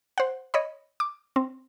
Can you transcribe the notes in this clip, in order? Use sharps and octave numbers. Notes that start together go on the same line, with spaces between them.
C5 F#5
C#5 D#5 B5
D6
C4